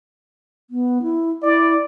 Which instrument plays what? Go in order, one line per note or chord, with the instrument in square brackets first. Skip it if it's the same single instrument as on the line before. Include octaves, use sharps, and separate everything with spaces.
[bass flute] B3
E4
[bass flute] E4 [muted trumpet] D5